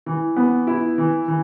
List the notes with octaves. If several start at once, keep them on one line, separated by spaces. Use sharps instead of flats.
E3
B3
E4
E3
E3